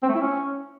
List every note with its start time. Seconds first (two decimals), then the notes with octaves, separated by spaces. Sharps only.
0.03 C4
0.09 A3
0.15 E4
0.21 C#4